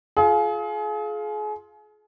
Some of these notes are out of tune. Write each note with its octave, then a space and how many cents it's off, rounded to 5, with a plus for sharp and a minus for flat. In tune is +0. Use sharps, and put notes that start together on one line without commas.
F4 +0 G#4 +35